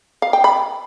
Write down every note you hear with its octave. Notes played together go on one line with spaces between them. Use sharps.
F5
G5
B5